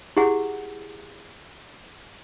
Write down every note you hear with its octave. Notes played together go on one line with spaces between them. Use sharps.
E4 G4 G#4 F#5